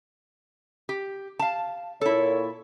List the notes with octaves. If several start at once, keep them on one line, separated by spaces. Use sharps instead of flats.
G4
F5 A5
A#2 E4 A4 C#5